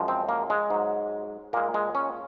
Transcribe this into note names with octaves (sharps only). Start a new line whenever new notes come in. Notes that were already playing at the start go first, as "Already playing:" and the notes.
Already playing: F#2 F3 G#3
C4
A#3
G#3
G#2 F#3
A#2 G#3 A#3
G#3
C#4